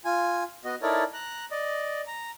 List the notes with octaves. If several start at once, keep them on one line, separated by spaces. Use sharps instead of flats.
F4 G#5
B3 F#4 D#5
D#4 E4 A4 A#4 C#5 D5
A#5 F#6
D5 D#5
A#5